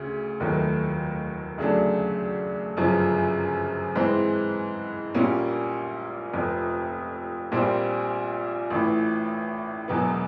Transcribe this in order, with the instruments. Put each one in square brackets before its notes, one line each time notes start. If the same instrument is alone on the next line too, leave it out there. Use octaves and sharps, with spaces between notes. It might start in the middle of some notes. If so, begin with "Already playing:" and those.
Already playing: [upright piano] D2 C#3
F1 D#2 D#3 F#3 A3
D2 C#3 F#3 A3 D4
G1 F#2 C#3 F3
G#2 E3 G#3 C4
A#1 A#2 G3 A#3 C#4
F1 F2 C3
A#1 A#2 G3 C4
A1 A2 E3
E1 E2 B2 F#3 B3